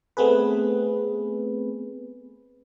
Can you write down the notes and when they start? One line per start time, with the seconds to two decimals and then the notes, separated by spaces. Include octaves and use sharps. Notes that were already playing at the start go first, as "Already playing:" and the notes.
0.17 A3 B3 C4 G#4 B4